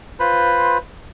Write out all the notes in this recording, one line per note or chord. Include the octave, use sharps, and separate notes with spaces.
F4 B4 C5 B5